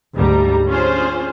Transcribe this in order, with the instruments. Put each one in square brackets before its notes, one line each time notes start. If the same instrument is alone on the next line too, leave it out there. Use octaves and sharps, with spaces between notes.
[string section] D2 G#2 G3 A#5
C#4 D4 F4 G#4 C5